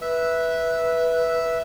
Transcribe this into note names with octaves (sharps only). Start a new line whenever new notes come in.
B4 E5